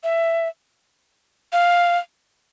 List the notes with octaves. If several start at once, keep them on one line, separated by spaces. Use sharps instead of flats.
E5
F5